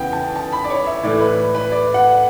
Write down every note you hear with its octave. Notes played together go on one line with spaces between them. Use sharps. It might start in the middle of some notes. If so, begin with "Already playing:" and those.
Already playing: E2 C#3 E3 F#5 G5
A5
A5
B5
D5
C#5
E5
A2 E3 A3 D5
B4
B4
D5
F#5